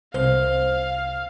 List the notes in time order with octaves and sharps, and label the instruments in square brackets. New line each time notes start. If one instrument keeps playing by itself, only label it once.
[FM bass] C2 [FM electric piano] C5 [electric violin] F5